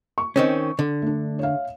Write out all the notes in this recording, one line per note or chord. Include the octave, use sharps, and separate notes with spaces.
C#6
D#3 C4 C#4
D3
A3 D4
C#5 E5 F5